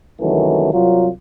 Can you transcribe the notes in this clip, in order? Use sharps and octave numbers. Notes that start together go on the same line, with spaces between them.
C2 F#2 D#3 E3 F#3 A3
C2 F#3 F4